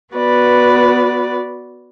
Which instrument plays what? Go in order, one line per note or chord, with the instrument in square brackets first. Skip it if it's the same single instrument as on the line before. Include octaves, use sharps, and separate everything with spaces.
[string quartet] B3 F#4 B4 D5